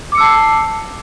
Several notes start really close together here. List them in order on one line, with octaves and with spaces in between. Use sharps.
D6 C#7 E6 A5 C7